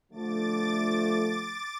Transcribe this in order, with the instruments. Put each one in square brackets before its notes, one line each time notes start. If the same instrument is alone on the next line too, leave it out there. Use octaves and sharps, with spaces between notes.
[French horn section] D3 F3 A3 [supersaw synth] D6 A6